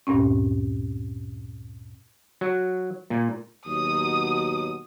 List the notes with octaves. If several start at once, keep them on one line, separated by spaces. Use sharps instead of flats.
D2 G2 A#2 C4 C#4
F#3
A#2
D#2 B2 F#3 D#6